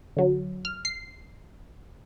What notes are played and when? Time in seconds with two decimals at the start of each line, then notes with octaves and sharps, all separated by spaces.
0.17 D3 F#3
0.65 F6
0.85 C7